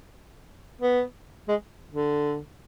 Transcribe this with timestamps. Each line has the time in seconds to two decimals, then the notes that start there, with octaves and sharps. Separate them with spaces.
0.81 B3
1.48 G#3
1.92 D3